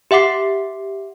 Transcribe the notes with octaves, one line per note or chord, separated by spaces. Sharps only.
G4 E5 F#5 D6 C7